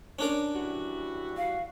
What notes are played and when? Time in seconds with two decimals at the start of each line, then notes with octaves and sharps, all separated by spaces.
0.19 C#4 D4 A#4
0.55 E3 G3 F#4
1.37 F5